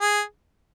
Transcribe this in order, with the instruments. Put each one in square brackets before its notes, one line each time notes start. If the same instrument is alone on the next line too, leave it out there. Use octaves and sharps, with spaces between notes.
[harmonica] G#4